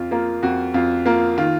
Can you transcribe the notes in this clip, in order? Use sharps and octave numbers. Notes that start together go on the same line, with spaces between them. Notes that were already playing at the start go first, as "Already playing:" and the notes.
Already playing: F2 F4
A#3 F4
F2 F#4
F2 F4
A#3 F4
D#3 F4